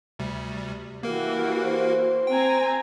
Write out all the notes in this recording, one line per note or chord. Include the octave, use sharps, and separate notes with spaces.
D2 C3 G3
E3 A#3 F#4 G4 A#4
C5
C4 G5 G#5 A#5